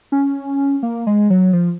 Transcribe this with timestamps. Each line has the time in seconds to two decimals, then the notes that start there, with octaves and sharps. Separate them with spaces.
0.12 C#4
0.83 A#3
1.07 G#3
1.30 F#3
1.53 F3